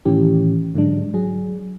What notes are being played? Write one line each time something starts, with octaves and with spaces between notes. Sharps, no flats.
A2 D#3 E3 C#4 G4
G#2 D3 F#3 G#3 D4
F#3 G#4